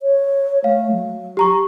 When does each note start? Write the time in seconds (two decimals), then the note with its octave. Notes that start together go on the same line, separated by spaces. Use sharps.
0.02 C#5
0.64 A3 F5
0.92 F#3
1.37 G4 A#5 C#6